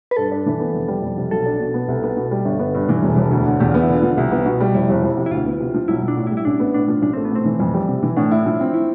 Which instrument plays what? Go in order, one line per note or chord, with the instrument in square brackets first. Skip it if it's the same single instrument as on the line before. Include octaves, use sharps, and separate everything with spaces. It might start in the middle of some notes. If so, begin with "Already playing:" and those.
[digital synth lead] B4
[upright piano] G2 [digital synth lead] A4
[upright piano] D4
E3
B3
F1
G3
F2
C3
[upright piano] B1 [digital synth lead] A4
[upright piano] D4
B2
B3
C2
B3
B2
G3
G1
B3
G2
E3
E1
E1
D2
D3
[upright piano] E2 [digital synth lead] G4
[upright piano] B3 [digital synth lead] F4
[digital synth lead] E4
[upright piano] D3
[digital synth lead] F4
[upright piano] F3
C2
B3
B2
G3
[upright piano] F1 [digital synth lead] E4
[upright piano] F1
F2
C3
[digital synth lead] E4
[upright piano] D2 [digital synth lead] F4
[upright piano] B3
C3
F3
[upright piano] B1 [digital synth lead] E4
[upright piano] B1
[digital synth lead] D4
[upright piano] A2
[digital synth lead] E4
[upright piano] G3
[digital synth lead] E4
[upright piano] A1 [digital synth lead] D4
[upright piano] B3
[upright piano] A2 [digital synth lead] D4
[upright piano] F3
[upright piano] A1 [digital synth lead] D4
[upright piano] A3 [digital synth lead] C4
[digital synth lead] B3
[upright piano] A2 [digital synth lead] C4
[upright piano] E3
F2
G3
C3
E3
[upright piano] A2 [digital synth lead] D4
[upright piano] E4
F3
C4
[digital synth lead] E4